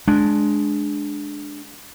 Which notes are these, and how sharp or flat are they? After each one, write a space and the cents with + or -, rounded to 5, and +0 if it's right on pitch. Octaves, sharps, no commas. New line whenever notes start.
G#3 +15 D4 +0